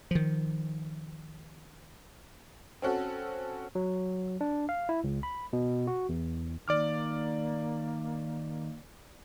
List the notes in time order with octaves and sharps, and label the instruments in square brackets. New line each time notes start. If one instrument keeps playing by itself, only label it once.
[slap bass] D#3 F3
[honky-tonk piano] C4 C#4 F#4 A4
[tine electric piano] F#3
D4
F5
E4
C#2
B5
B2
F#4
E2
[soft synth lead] D#3 [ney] A#3 [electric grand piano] D5 D6 F6